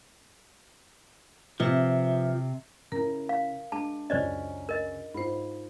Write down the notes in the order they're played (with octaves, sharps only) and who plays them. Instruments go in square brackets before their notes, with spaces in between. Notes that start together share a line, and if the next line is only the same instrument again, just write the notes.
[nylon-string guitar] C3 [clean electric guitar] F3 [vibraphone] B4 E5
[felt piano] C#3 E4 [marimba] A#4 A#5
[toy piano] F5
[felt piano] G#3 [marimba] D4 [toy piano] A5
[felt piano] C#2 F#2 C#4 [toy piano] C5 D5 D#5
[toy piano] A#4 D#5
[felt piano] G#2 F4 [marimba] C5 B5